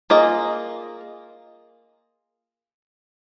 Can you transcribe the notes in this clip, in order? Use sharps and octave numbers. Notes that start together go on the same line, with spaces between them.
A#3 F4 G#4 D#5